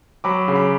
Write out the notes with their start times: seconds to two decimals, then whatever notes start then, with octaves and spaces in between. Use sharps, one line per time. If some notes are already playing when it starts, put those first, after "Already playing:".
0.24 F#3 B5 D6
0.48 C#3
0.55 B5 D6